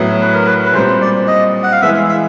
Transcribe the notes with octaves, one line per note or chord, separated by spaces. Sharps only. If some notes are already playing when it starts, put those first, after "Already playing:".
Already playing: A2 F#3 B3 E4
B4
A#4
B4
B4
A#2 G3 C4 C5
D5
D#5
F#5
F5
E3 G#3 B3 E5
E5